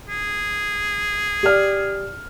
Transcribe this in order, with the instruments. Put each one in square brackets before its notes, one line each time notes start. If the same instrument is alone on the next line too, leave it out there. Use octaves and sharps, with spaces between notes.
[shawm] G#4
[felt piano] G4 D5 F6